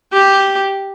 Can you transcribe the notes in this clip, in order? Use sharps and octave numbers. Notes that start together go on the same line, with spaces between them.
G4